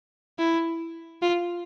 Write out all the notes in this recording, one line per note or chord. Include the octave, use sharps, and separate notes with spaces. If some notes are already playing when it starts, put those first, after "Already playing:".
E4
F4